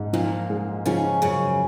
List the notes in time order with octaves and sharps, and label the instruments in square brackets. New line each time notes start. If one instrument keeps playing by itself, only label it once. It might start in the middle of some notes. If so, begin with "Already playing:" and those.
Already playing: [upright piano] G#2
[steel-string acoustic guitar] A#2 A#3 [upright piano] F3
[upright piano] G#3
[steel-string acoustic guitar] C#3 C#4 [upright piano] F3
[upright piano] F#2 [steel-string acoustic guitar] C#3 C#4